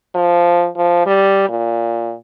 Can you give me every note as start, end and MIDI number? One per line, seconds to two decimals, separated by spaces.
0.15 0.68 53
0.76 1.05 53
1.06 1.46 55
1.49 2.14 46